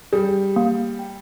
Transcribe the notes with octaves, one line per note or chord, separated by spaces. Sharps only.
G3 G#4
A#3
G5